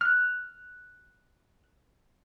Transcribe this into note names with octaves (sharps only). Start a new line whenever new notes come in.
F6 F#6